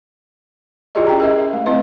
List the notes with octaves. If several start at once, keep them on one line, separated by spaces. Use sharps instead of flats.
E4 F4 G4 G#4 D5 D#5
C#4 G5 A#5
G#4 A#4 D#5 E5
E5
A3
A3 C4 E4 B4 D#5